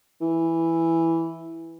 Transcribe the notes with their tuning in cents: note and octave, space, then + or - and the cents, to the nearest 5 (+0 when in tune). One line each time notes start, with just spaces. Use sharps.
E3 +0